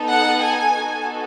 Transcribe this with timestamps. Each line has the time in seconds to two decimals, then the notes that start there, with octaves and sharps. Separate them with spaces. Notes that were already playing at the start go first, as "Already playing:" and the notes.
Already playing: B3 D#4 A4
0.10 F#5
0.43 G#5
0.75 B3 D#4 F#4 A4